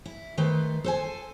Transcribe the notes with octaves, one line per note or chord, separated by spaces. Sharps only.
E4
D#3 A3 B4 C5
A4 C5 G#5